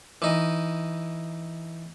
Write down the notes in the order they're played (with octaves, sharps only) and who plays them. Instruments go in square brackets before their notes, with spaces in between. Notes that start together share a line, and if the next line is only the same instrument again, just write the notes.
[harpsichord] E3 D#4